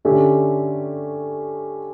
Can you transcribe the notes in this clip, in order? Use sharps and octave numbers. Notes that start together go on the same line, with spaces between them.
D3 A3 C#4 G4